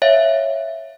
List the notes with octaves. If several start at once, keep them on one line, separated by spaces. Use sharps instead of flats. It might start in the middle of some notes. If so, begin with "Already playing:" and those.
C#5 E5 F5